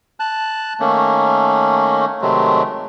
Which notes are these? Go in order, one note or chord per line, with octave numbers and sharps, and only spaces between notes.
A5 F#6
D#3 A3 A#3 C#4
C3 D#3 F#3 G#3 A3